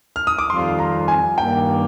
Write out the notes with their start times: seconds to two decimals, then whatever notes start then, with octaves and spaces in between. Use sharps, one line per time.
0.16 F6
0.27 D#6
0.38 D6
0.50 F2 D#3 G3 C4 F4 C6
0.79 A#5
1.08 G#5
1.37 G2 D#3 G3 A#3 D4 G5